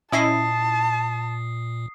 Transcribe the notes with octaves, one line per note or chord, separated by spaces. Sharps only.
A#2 C#4 E4 D#5 A5 D#6 C7